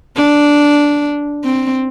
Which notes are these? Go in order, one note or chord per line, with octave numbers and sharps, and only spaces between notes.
D4
C4